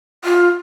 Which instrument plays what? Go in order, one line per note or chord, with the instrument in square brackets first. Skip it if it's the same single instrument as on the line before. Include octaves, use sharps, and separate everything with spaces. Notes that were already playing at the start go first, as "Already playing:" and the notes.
[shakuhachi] F4